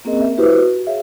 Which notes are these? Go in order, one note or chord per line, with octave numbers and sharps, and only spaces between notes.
A#3 C4 C#4 G#4 A#4 D#5
E5
E4 F#4 G4 B4 C5
F#4
G#4 C#5 E5 F5